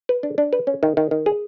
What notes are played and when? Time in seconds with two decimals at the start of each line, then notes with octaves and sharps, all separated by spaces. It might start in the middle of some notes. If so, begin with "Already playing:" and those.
0.09 B4
0.23 D4
0.38 D4
0.53 B4
0.67 C#4
0.83 D#3
0.97 D#3
1.11 D#3
1.26 G#4